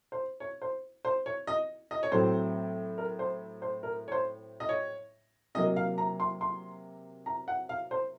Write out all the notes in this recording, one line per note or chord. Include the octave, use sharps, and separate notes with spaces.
C5
C#5
C5
C5
C#5
D#5
D#5
C#5
A2 F#3 A3 C4 C5
A#4
C5
C5
A#4
C#5
C5
D#5
C#5
C3 F#3 A#3 D#5
F5
A#5
C6
C6
A#5
F#5
F5
C5